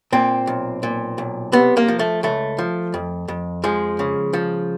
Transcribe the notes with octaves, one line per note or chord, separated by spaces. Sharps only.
A#2 C4
B1
A#2
B1
C3 B3
A#3
F3
A3
C#2 A3
F3
F2
F2
F3 G#3
C#3
F3